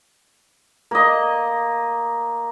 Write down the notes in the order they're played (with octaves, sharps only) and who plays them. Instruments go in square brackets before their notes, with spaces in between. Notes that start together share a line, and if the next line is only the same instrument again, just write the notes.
[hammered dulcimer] A#3 D#5